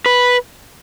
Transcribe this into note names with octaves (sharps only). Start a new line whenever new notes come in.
B4